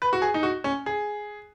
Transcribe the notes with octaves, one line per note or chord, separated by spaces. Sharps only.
B4
F#4
G#4
D#4
F#4
C#4
G#4